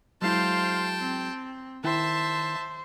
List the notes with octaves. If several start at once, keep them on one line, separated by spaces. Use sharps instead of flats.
F#3 G#3 E4 C5 F5 G5 A5
C4
D#3 E4 C5 E5 G5 A5